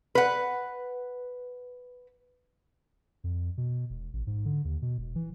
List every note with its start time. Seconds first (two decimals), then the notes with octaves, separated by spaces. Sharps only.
0.15 B4 F#5
3.24 F2
3.57 B2
3.90 E1
4.13 A1
4.27 G#2
4.45 D3
4.65 D#2
4.82 B2
4.98 E1
5.15 E3